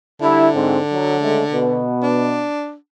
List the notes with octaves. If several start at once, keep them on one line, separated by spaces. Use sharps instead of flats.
D3 G3 E4
G#2 C4
F#3
C#3 G#3 A3
B2 B3
D4